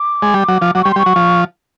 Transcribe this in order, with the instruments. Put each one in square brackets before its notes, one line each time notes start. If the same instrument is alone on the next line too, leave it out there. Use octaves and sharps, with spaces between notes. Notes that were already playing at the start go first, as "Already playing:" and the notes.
Already playing: [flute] D6
[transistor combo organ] G#3
G3
F#3
F3
[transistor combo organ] F#3 [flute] D6
[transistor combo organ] G3 [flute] C#6
[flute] C6
[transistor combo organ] G3
[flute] C#6
[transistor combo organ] F#3
F3